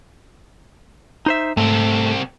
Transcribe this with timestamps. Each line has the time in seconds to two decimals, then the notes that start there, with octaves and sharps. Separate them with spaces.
1.26 D#4 C5 E5
1.57 C2 G#2 A3 C4